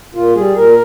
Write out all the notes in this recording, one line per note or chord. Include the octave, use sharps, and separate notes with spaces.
A#2 F4
G3 G#4
A#2 A#4